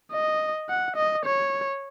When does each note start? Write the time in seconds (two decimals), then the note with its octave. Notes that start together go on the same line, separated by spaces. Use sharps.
0.12 D#5
0.69 F#5
0.96 D#5
1.25 C#5